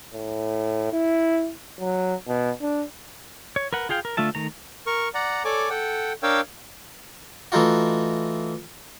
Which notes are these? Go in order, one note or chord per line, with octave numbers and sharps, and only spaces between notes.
A2
E4
F#3
B2
D4
C#5
A#4 B4 F#5
F4 G#4 F5 G5
A#4
D3 A3 F4 E5 A5
D#3 A3 A#5
A#4 C#6
D5 F#5 A#5
A4 C#5 D5 G#5 D6
A4 F#5 G5
D4 A#4 C#5 F5 G5 E6
E3 A3 D#4 F4 F#4